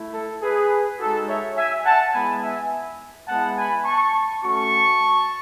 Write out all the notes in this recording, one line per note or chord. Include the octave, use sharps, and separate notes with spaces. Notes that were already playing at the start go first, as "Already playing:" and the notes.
Already playing: A3 E4
A4
G#4 B4
G#3 D#4 F#4 A4
C#5 E5
E5 G#5
F#5 A5
G#3 B3 E4 G#5 B5
E5 G#5
G#3 B3 E4 F#5 A5
G#5 B5
A5 C#6
A3 C#4 F#4 A5 C#6